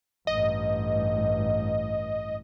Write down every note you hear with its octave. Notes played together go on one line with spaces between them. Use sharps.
A1 G2 D#5